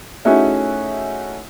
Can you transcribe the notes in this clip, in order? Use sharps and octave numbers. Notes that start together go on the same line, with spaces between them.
A3 C#4 D#4 E4 F#4 G#4